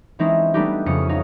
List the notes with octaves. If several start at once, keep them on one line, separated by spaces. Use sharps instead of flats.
E3 G#3 C4 C#4 D#4 E4
G3 A3 B3 D4 D#4 G4
F2 C#3 C#4 D#6 C#7 D#7
D#4 C#5 F5 F#5 D#6